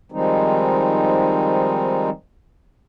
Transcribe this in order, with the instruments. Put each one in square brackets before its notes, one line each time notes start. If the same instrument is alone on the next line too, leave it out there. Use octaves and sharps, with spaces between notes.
[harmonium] D#3 F3 G3 G#3 C4 D#4